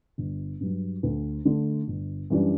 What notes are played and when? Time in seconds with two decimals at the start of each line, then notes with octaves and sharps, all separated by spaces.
0.18 G1
0.61 G2 F#3
1.03 D2
1.45 D3 A3
1.88 G1
2.30 F#2 E3 G3 D4